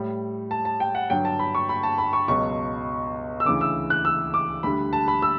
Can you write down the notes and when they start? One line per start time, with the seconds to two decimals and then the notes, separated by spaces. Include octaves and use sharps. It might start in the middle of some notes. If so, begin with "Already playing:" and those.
Already playing: A2 G3
0.51 A5
0.65 A5
0.80 G5
0.95 F#5
1.10 G2 D3 F#3 G5
1.25 A5
1.39 B5
1.55 C#6
1.69 B5
1.83 A5
1.98 B5
2.13 C#6
2.28 C#2 B2 F#3 C#6
3.40 E6
3.45 D2 C#3 E3 D6
3.61 E6
3.90 F#6
4.05 E6
4.34 D6
4.63 D2 D3 G3 B5
4.93 A5
5.08 B5
5.22 E6